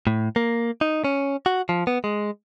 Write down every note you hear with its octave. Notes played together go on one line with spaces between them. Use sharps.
A2
A#3
D#4
C#4
F#4
F3
B3
G#3